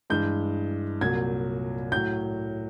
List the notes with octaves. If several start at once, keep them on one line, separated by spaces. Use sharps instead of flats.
G2 E3 G#3 G6
C2 A#2 F#3 G#6
A2 F#3 G6